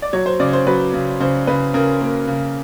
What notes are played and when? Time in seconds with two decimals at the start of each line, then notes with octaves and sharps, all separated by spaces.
0.02 D5
0.13 F#3 C#5
0.26 C5
0.40 C#3 D5
0.53 C5
0.67 F#3 B4
0.94 C#3
1.20 C#3 C5
1.47 C#3 B4
1.74 C#3 A#4
2.01 A#3
2.28 C#3